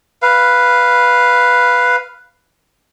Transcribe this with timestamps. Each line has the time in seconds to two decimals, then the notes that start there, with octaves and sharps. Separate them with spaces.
0.22 B4 F5